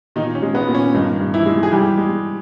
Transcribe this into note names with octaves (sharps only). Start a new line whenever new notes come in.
A#2 D#3 D#4
C#4
G#3
B3
A#2
C#4
G2 D#3 D#4
G2
E3 E4
G#3
G#4
E3 G3 G4
G#3